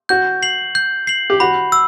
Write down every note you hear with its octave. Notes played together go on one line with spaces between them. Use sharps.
F#4 G6
C7 F#7
G6
C7 F#7
G4
F#4 B5
E6